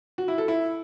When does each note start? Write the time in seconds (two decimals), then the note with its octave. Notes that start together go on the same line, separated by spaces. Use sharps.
0.18 F#4
0.28 E4
0.38 A4
0.48 E4